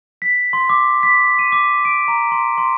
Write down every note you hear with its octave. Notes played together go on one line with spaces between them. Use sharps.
B6
C6
D6
B6
D#7
D6
D7
A#5
C6
C6